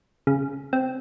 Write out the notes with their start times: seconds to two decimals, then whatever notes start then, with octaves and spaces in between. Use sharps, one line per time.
0.27 C#3
0.73 C4